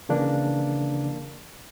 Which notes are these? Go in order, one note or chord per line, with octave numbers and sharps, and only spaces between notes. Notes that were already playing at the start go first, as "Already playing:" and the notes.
C#3 E3 A#3 D4